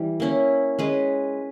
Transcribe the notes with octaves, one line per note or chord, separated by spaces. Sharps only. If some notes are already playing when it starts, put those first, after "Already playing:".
Already playing: E3 G3
A#3 C#4 E4
G#3 C#4 G#4 B4